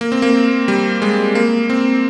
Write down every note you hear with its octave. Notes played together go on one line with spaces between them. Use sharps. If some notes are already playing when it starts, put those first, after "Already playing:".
A#3
C4
A#3
G3
G#3
A#3
C4